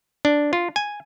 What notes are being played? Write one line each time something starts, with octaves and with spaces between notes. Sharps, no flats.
D4
F4
G#5